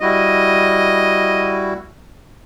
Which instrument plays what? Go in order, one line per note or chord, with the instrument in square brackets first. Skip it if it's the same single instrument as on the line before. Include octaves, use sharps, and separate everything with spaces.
[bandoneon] G3 E4 F#4 [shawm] D#5